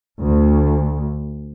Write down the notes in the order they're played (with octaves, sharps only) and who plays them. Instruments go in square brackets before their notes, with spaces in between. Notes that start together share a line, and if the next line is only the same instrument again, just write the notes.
[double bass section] D2